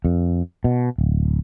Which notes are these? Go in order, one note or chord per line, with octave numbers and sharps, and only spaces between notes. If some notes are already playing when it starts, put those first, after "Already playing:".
F2
B2
D1